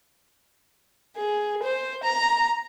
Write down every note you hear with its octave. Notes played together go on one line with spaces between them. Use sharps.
G#4
C5
A#5